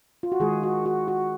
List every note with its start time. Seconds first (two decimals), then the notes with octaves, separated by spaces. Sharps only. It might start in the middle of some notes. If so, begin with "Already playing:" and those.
0.23 F4
0.32 F#4
0.40 D#3 G#3 G#4
0.63 F#4
0.86 F#4
1.08 F#4